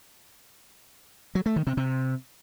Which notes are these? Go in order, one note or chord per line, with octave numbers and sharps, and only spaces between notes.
F#3
A3
D#3
C3
C3